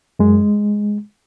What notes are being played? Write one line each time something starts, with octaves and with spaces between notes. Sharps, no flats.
F#2 G#3